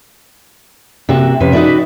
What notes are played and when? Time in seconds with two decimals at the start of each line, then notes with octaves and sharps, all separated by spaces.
1.09 C3 A#3 F#4 E5
1.40 F2 C3 C#4 B4
1.52 D#4 F#4 A4 B4 D5 E5